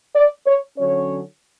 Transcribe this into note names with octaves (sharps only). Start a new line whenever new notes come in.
D5
C#5
D3 F#3 C#4 C#5